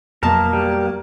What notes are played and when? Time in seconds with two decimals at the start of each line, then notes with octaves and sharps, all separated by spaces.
0.23 F2 B2 F#3 A#3 A#4 A5
0.53 G3